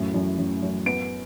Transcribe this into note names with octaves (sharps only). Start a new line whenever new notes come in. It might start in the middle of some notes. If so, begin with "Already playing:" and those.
Already playing: F#2 A2
F#2
F#2
F#2
B3 D7